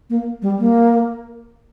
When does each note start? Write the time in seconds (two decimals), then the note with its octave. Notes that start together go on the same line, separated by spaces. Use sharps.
0.10 A#3
0.42 G3
0.59 A#3